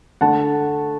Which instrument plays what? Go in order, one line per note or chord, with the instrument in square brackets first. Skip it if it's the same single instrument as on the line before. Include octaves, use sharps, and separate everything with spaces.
[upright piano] D3 A3 F#5 A5